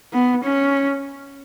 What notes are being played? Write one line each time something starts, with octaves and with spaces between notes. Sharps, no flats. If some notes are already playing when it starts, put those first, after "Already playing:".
B3
C#4